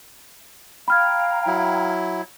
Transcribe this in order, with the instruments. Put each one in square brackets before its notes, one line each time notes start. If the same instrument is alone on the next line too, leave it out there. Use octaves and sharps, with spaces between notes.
[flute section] F5 G5 A#5 [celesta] B5 F6 G#6
[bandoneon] F#3 E4